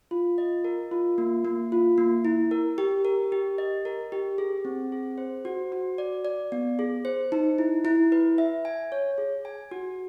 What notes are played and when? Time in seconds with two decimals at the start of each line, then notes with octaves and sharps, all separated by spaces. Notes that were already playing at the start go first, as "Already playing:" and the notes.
0.11 F4
0.38 D#5
0.64 A#4
0.91 F4
1.18 A#3
1.45 A#3
1.72 F4
1.98 A#3
2.25 E4
2.51 A#4
2.78 G4
3.05 A#4
3.32 G4
3.58 D#5
3.85 A#4
4.12 G4
4.38 G#4
4.65 C4
4.92 G#4
5.18 C5
5.45 F#4
5.72 F#4
5.98 D5
6.25 D5
6.52 B3
6.79 G#4
7.05 C5
7.32 D#4
7.58 E4
7.85 E4
8.12 B4
8.38 E5
8.65 G#5
8.92 C#5
9.18 G#4
9.45 G#5
9.71 F#4